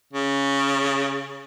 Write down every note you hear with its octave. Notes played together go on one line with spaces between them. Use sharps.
C#3